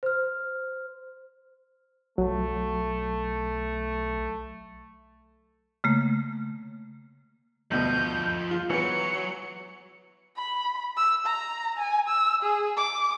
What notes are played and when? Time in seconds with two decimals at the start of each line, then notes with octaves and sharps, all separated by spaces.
0.03 C5 F6
2.18 B1 F#3 A3
5.84 C#3 A3 A#3
7.71 D2 B2 F3 D#5 G6
8.51 F4
8.70 E3 F#3 B3 C#7
10.37 B5
10.97 E6
11.26 A#5
11.78 G#5
12.08 E6
12.42 G#4
12.77 D6